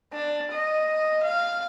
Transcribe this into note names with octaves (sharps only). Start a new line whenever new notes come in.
D4
D#5
F5